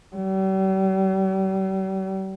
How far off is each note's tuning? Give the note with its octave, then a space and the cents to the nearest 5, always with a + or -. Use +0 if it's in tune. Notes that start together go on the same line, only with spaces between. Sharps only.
G3 -45